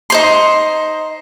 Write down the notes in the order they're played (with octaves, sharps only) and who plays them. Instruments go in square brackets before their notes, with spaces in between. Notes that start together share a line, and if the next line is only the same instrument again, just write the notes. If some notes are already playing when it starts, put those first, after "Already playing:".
[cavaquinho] D#4 C5 C6